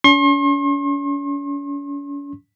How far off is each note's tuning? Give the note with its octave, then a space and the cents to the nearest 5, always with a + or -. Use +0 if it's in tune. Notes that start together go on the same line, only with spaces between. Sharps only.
C#4 +45 C6 +45